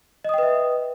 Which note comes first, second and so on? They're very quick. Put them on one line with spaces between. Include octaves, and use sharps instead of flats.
D#5 D#6 G5 B4 E5